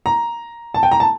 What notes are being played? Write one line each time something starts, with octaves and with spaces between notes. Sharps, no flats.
A#5
A5
G5
A#5
A5